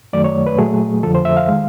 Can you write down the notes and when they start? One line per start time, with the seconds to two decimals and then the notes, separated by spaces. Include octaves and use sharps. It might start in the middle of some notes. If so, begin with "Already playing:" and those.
0.13 F#2 D#3 F#3 A3 D5
0.24 C#5
0.47 B4
0.58 A#2 F#3 A3 G#4
1.03 F2 D3 F3 A4
1.15 C5
1.25 E5
1.37 F5
1.48 D#3 G#3